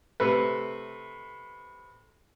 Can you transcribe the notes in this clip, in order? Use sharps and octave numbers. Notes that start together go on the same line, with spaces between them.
C3 A3 B4